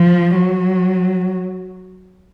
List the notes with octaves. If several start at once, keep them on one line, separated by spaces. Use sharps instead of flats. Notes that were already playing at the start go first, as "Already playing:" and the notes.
Already playing: F3
F#3